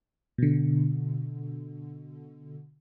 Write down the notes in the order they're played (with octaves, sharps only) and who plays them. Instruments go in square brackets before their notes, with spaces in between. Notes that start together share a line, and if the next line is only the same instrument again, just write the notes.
[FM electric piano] B2 D3